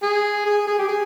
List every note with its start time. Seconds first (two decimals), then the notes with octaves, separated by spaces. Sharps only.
0.02 G#4
0.46 G#4
0.67 G#4
0.78 G4
0.88 G#4